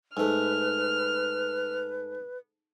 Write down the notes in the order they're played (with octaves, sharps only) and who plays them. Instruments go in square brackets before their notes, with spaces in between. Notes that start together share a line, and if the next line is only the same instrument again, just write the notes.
[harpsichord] G#2 A3 [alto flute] B4 [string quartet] F6